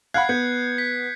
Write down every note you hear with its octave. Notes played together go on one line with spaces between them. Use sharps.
F5 F#5 B5 F#6 G#6 C7
B3 G6 G#6 C#7
B6